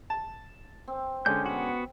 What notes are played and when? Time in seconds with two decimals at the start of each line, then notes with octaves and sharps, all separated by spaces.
0.10 A5
0.88 C4
1.26 D3 G#3 C#4 G6
1.46 B3 F#4